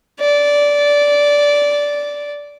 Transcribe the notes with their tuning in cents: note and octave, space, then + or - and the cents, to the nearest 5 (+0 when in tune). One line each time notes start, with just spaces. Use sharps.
D5 -15